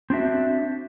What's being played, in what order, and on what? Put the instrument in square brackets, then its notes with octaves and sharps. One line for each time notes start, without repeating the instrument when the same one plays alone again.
[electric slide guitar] C4 D4 F#4 E5